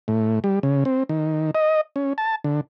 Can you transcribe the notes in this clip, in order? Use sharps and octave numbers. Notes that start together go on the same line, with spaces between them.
A2
G3
C#3
C4
D#3
D#5
C#4
A5
D3